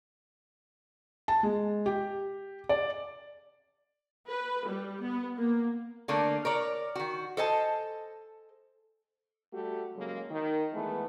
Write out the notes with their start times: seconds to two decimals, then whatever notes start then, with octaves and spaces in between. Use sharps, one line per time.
1.28 A5
1.43 G#3
1.86 G4
2.69 D5
4.28 B4
4.67 G3
5.03 B3
5.37 A#3
6.08 D3 A3 A#3 D4
6.45 A#4 C#5 D5
6.96 D#3 F#4
7.37 A4 C5 D#5 G#5 A5
9.53 G3 A3 F#4 G4
9.95 C#3 F#3 G#3 A#3
10.31 D#3
10.73 E3 G#3 A3 B3